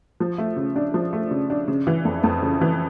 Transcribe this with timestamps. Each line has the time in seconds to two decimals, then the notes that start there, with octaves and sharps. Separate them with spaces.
0.20 F3
0.38 A3
0.57 C#3
0.76 D4
0.94 F3
1.13 A3
1.31 C#3
1.50 D4
1.68 C#3
1.87 E3
2.05 F2
2.24 F2
2.43 C#3
2.61 E3